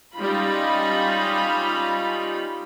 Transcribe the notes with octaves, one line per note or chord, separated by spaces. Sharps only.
G3 C#4 D#4 F4 B5